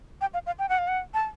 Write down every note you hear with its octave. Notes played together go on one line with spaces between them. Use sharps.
G5
F5
F5
G5
F#5
F5
F#5
A5